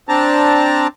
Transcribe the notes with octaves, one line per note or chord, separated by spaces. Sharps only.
C4 D4 A5 A#5